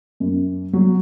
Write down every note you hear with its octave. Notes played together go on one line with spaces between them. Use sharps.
F#2
F#3